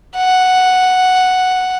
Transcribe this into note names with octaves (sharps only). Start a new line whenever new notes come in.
F#5